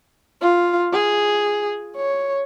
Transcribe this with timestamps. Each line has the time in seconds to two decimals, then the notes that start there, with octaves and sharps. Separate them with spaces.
0.41 F4
0.93 G#4
1.96 C#5